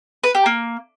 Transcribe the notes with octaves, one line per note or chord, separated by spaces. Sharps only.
B4
G4
A#3